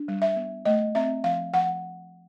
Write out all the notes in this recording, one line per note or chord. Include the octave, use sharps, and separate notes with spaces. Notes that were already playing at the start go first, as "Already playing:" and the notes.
Already playing: D4
G3
E5
B3
A3 D#5
C4 E5
F3 F5
F3 F#5